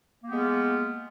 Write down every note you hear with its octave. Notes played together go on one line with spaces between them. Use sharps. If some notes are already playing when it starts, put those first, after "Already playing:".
G#3 A#3 B3 F4 G4